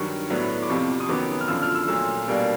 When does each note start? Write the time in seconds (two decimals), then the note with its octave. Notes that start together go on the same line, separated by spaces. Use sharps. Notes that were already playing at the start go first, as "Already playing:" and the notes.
Already playing: G2 D#3 F#3 C#6
0.30 A2 F#3 B3 D4
0.63 D6
0.69 F2 C3 F3 C#6
1.00 D#6
1.08 F#2 D#3 F#3 B3 D6
1.41 F6
1.48 F#2 D3 F3 E6
1.62 F6
1.75 E6
1.88 A#2 F#3 A3 E6
2.28 B2 G3 A#3 D4